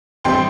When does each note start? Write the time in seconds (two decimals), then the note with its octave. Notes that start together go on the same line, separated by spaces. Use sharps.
0.24 A1 A2 G3 C4 G5 C6